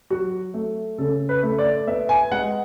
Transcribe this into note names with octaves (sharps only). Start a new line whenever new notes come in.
F#3 F#4
A3
C#3 A4
B4
A3
D5
B3 E5
G#5
G#3 F#5